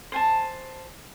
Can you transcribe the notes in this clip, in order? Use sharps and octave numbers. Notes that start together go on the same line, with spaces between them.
C5 G#5 A5